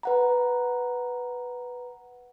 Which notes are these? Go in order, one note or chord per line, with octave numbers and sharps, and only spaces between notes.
B4 F#5 A#5